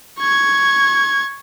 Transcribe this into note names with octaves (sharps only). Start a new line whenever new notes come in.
C#6 G#6